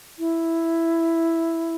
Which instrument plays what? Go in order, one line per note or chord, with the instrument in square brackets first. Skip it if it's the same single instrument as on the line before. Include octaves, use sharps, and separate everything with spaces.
[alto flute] E4